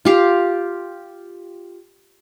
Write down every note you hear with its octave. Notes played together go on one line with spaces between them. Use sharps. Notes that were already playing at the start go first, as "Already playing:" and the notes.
F4 G4 F5